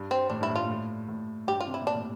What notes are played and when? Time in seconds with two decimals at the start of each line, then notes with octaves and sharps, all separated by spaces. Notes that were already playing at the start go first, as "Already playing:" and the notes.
Already playing: G2
0.11 C4
0.30 A2 D4
0.41 G2 E4
0.50 A2
0.56 F4
0.61 A#2
0.70 A2
1.08 A2
1.47 G2 G4
1.60 F4
1.67 C3
1.74 E4
1.81 A#2
1.87 D4
1.95 A2